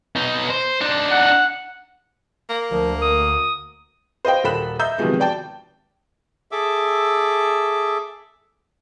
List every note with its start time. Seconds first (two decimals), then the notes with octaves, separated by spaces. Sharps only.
0.16 B2 D#4
0.50 C5
0.81 D4 D#4
1.11 F#5
2.50 A#3
2.71 D2 F3 A#4
3.02 D#6
4.25 C5 D#5 F5 G5
4.44 D#1 A4 A#4 B5 F#6 E7
4.79 D#5 E5 A#5 E6 G6
4.98 C3 D#3 F3 F#3 G#3 B3
5.20 D5 G5 A5
6.52 G#4 A4 E5 D6 E6